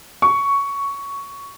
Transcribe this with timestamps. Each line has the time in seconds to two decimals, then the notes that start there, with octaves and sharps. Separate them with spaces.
0.22 C#6